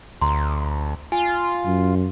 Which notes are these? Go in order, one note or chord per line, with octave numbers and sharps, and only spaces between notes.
D2 A#5 C6
F4 G#5
F#2